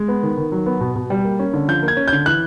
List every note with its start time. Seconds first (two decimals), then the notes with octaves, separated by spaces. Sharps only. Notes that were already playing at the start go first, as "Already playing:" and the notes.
Already playing: G#3
0.08 B3
0.23 D#3
0.38 D#3
0.52 F#3
0.66 B3
0.80 B2
0.96 B2
1.10 G3
1.25 A#3
1.39 C#4
1.54 D3
1.68 F3 G6
1.83 A#3
1.88 G#6
1.97 C#4
2.08 D3 G6
2.26 E3 F#6